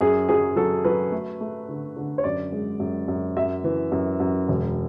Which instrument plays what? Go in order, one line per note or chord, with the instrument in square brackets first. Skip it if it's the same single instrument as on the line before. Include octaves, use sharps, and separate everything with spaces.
[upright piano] F#2 G#4
F#3 G#4
F#3 A4
F#3 B4
A3
A3
D3
D3
C#5
F#2 D5
G#3
F#2
F#2
F#2 E5
E3
F#2
F#2
E1